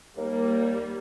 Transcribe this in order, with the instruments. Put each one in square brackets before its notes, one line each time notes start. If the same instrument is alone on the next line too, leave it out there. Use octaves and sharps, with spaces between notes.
[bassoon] D#2 [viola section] G3 A#3